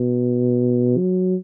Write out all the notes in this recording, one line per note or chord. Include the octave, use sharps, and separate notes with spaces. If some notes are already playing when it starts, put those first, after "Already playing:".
Already playing: B2
F#3